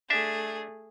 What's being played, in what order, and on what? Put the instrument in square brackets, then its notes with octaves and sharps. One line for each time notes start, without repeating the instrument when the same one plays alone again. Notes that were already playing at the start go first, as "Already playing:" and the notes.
[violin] A3 G#4 [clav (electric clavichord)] D4 E5